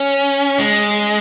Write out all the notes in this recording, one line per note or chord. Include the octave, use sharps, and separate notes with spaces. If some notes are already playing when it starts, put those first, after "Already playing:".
Already playing: C#4
G#3